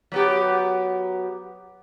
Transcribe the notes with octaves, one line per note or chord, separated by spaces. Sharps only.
F#3 B3 G4